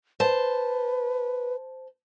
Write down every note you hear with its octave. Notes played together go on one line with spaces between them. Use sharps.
B4 C5 A5